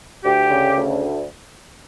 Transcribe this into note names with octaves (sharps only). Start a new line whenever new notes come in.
D2 G4
C#3
D2